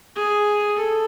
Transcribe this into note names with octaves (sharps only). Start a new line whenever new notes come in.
G#4
A4